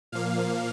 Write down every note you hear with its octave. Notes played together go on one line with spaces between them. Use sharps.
A#2 F3 A#3 F5